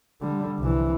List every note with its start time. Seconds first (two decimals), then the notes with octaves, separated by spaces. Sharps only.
0.22 D3 G3
0.59 C2 E3